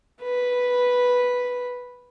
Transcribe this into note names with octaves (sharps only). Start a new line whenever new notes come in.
B4